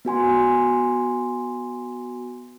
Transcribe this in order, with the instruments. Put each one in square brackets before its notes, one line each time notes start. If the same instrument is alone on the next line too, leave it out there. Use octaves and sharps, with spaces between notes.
[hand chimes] B3 F#4 G#5 C6